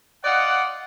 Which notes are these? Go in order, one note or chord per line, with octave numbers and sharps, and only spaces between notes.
F4 D5 D#5 F#5